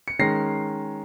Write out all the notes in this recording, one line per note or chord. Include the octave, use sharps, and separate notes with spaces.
C#7
D#3 G#3 C#4 A#6 C7